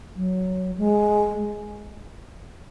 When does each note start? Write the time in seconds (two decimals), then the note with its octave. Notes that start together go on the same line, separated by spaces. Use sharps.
0.16 F#3
0.78 G#3